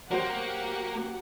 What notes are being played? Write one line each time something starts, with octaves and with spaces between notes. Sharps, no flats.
F#3 A#3 F#4 G4 C5 F#5